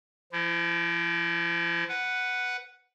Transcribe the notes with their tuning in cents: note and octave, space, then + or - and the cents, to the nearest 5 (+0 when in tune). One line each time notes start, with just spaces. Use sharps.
F3 -30 E4 +30
B4 +0 F#5 +0